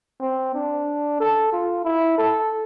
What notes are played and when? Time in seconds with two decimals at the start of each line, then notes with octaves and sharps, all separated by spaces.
0.21 C4
0.54 D4
1.20 A4
1.52 F4
1.85 E4
2.18 A4